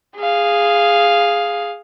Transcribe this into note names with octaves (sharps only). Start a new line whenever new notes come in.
G#4 F5